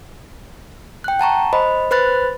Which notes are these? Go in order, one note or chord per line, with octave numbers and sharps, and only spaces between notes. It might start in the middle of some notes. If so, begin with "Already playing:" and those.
G5 F#6
F#5 A5 A#5 C#6
C5 D#5 B5
B4 C5 B5 F#6 A6